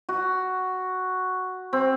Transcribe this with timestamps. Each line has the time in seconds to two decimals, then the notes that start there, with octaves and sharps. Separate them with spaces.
0.09 F#4
1.73 C4